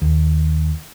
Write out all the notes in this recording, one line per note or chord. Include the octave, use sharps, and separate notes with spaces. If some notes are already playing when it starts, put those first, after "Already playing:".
D#2